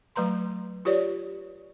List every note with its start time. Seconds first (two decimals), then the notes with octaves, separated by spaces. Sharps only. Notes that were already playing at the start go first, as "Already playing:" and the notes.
0.16 F#3 A3 B4 A#5 C6
0.85 F4 G4 B4 C#5 D5